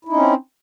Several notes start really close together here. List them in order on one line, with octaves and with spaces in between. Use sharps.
E4 D#4 C#4 C4